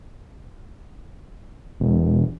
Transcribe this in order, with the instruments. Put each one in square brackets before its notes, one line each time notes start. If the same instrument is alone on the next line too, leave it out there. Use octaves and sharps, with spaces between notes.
[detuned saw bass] E1